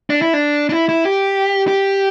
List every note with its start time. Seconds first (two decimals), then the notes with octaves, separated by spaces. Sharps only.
0.10 D4
0.22 E4
0.33 D4
0.69 D4
0.73 E4
0.89 E4
1.05 G4
1.68 G4